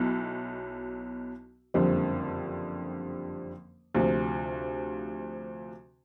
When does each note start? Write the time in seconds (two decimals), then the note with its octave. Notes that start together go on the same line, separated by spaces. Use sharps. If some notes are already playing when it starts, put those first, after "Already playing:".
Already playing: B1 B2 F#3 E4
1.74 F#1 F2 D3 G3 C4
3.94 D2 C3 F3